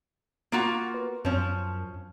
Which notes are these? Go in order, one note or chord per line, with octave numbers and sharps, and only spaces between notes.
A#3 F4 F#4
B3
F#2 F3 C#4